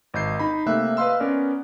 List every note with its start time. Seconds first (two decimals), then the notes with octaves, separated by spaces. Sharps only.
0.14 G#1 D#5 G6 C7
0.39 D#4 B5
0.66 C3 A3 A#3 E5 F#6
0.97 B4 D#5 F5 C6 E6
1.20 B3 C#4 A#4 D5